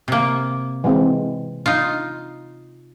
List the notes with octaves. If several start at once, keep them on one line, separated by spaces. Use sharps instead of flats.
C3 A#3
E3 G#3 C4
D#4 F4